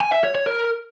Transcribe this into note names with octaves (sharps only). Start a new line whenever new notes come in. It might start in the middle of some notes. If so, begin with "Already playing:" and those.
G#5
E5
C#5
C#5
A#4